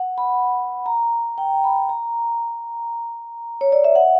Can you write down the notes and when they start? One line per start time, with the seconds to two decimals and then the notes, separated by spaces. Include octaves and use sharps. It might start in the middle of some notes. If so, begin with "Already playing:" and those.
Already playing: F#5
0.18 B5
0.86 A#5
1.38 G5
1.64 B5
1.89 A#5
3.61 C#5
3.72 D5
3.84 E5
3.95 F#5